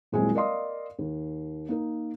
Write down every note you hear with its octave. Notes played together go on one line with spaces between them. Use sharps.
D#1 F#3 G#3 C4 E4 G#5
A#4 D5 D#5 F5 C6 D#6
D#2
A#3 D#4 A#4